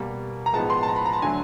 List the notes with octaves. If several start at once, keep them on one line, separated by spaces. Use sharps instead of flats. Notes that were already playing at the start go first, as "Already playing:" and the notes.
Already playing: B2 G3 A#3
A#5
A2 F3 G#3 B3 D#4 A5
C6
A5
A#5
B5
A#5
A5
D3 F#3 A3 G#5